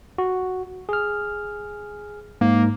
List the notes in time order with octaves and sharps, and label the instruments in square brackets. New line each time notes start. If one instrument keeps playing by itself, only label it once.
[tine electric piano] F#4
G#4 F6
[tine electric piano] G#2 [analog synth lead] A#3